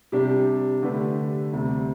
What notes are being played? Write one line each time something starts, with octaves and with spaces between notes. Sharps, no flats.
C3 G3 D4 G4
D3 A3 D4 G4 B4
D2 C3 G3